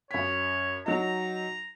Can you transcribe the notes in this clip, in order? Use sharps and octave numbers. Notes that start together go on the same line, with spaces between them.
F#2 C#5 B6
F#3 D#4 A#5